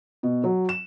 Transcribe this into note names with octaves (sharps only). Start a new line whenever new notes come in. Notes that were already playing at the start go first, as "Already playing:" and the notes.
B2
F#3
E7